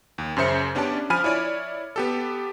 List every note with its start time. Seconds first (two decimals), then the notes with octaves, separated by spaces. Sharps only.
0.18 D#2
0.37 F#2 C#3 C5 E5 C#7
0.75 B3 C#4 D4 G4 D5 A5
1.10 F3 G#5 B5 F6 D#7
1.24 E4 C#5 D5
1.96 B3 G4 A4